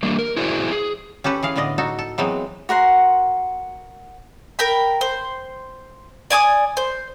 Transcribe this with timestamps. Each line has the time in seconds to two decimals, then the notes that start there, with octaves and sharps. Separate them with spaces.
0.03 G3 A#3 D4
0.19 A#4
0.37 E4 F#4 G#4 C5 D5
0.72 G#4
1.24 C#4 G4 A4 B4
1.43 E3 G#4 F5
1.56 A2 D3 B3 D5 D#5
1.78 D#4 F#4 A4
1.99 A4
2.18 E3 F#3 G#3 B3 C4
2.69 F#4 A#4 F#5 C6
4.59 A#4 G5 B5
5.01 C5
6.30 D5 G#5 D6 D#6
6.77 C5